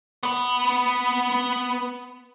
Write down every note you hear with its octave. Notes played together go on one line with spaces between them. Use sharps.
B3 B4